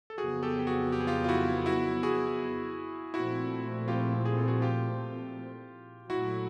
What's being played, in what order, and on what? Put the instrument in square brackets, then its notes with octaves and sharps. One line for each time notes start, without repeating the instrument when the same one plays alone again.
[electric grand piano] A4
[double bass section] F2 C#3 F#3 B3 [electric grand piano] F#4 G#4
[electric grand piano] G4 A4
G4
F#4 G#4
G4
G#4
F4 G4
F4
E4 F#4
E4 F#4
F#4 G#4
[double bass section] A#2 F3 A3 C4 [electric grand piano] E4 F#4
[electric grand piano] F4 G4
G#4
A4
F#4 G#4
F4 G4
[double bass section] A#2 F#3 A3 [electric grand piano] E4 F#4